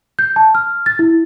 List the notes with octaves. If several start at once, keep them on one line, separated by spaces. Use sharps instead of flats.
G6
A5
F6
A6
E4